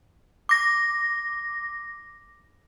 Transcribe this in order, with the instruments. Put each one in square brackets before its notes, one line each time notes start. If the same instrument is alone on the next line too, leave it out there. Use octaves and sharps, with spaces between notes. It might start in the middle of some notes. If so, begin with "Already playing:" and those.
[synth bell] D6 A#6